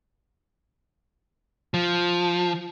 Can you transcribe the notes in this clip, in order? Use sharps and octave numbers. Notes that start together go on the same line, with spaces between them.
F3